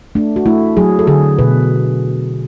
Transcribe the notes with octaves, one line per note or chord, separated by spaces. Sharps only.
A3 D4
F#4
A3 E4
F#3 G#4
A4
D3 G#4
B2 B4